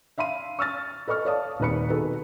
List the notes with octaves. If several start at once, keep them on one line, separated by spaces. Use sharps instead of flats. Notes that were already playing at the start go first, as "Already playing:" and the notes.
E5 F5 B5 C6 D#7
C#6 E6 F6 A6
A4 B4 D#5 C#6 F6
A4 C#5 D5 F5 A5 D#6
D#1 D#2 C4 B4 B5 C#7
B2 D#3 G#4 A4 B4